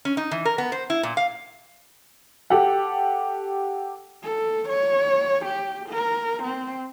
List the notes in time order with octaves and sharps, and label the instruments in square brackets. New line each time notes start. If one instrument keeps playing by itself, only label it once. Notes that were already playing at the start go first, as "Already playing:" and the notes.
[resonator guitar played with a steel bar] C#4
D#4
E3
A#4
B3
C5
E4
A#2
F5
[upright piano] G4 A4 F#5
[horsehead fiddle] A4
C#5
G4
A#4
C4